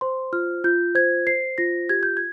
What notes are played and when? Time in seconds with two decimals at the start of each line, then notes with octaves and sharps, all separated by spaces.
0.01 C5 C6
0.33 F4 F6
0.64 F4 G6
0.95 C5 G#6
1.27 C5 C7
1.58 F4 A#6
1.89 G4 G#6
2.03 G6
2.17 G#6